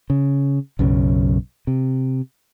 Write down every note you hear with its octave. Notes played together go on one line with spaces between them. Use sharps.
C#3
B1 F#2 C#3
C3